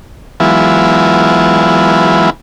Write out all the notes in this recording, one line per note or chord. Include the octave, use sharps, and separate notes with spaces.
E3 F#3 G#3 B3 E4 F4